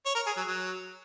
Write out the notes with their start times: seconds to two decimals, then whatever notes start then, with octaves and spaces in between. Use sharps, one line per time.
0.06 C#5
0.15 A#4
0.26 G#4
0.37 F#3
0.47 F#3